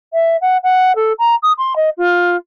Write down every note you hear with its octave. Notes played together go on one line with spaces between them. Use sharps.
E5
F#5
F#5
A4
A#5
D#6
C6
D#5
F4